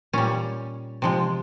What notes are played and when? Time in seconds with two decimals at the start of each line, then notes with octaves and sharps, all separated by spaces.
0.13 A#2 G3 C#4
1.02 C3 F3 G#3